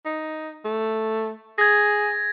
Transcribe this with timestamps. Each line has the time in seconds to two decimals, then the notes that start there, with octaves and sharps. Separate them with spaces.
0.05 D#4
0.65 A3
1.58 G#4 G#6 A#6